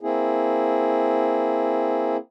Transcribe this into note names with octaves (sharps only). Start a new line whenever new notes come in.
A#3 C4 E4 G#4